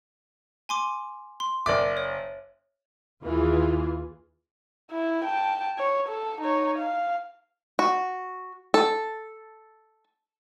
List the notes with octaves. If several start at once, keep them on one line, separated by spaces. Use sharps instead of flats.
G#5 C6 D6
C6
F#1 D5 E5 D6
C#5
D#2 E3 F4 G#4
E4
G5 A5
C#5
A4
D#4 C#5
F5
F#4
A4